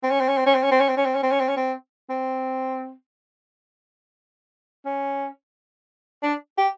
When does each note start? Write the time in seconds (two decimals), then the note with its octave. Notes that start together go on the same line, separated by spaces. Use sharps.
0.03 C4
0.11 C#4
0.20 C4
0.28 C#4
0.37 C4
0.46 C#4
0.55 C4
0.63 C#4
0.71 C4
0.80 C#4
0.89 C4
0.97 C#4
1.06 C4
1.15 C#4
1.23 C4
1.31 C#4
1.40 C4
1.48 C#4
1.57 C4
2.10 C4
4.85 C#4
6.23 D4
6.58 G4